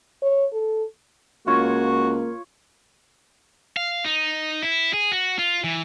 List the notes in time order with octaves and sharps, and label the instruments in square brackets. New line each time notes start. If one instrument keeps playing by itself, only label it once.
[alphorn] C#5
A4
[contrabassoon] C#2 [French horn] A#3 [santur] F4 C#5 [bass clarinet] F#4
[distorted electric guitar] F5
D#4
E4
G#4
F#4
F4
E3